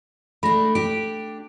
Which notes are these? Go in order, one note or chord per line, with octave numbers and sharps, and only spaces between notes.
A3 D4 B5 A#6
D4 G4 D7